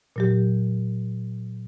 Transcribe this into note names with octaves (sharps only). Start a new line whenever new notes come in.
A#2 F#3 G4